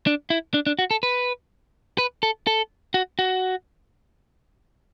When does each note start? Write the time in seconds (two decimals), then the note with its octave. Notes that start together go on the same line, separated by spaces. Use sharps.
0.07 D4
0.30 E4
0.54 D4
0.67 D4
0.79 F#4
0.91 A4
1.03 B4
1.98 B4
2.23 A4
2.47 A4
2.94 F#4
3.19 F#4